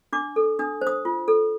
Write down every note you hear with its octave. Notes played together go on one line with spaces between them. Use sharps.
D4 D6
A4
D4 D#6
C5
D#6
F4
A4